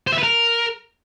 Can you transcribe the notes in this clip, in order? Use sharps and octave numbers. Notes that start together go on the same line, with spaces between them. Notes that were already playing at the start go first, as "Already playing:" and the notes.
C5
E5
B4
A#4